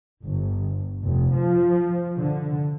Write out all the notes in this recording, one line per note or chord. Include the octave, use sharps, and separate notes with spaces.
G1
F1
F3
D3